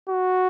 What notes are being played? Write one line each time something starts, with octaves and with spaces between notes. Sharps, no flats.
F#4